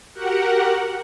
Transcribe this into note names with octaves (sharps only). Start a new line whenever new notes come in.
F#4 G4 A#4 F#5